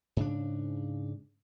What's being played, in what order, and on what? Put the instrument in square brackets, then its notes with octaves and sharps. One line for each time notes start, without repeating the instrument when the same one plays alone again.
[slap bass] G#2 C#3 D4